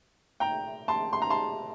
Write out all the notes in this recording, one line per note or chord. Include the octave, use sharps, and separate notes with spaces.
G5 A#5
A5 C6
C6
A#5
A5 C6